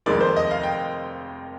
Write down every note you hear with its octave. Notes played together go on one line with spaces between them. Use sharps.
F1 F2 D#3 G#3 D5
C5
D#5
F5
G5